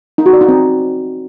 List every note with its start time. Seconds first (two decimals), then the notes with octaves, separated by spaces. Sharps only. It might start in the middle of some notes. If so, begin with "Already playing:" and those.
0.18 D#4
0.26 F#4
0.33 D5
0.41 D#4
0.48 C4